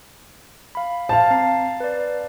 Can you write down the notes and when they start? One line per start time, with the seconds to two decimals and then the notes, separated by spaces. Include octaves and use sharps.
0.75 F5 B5
1.09 C5 F5 A5
1.31 C4 A#5 C7
1.80 B4 D5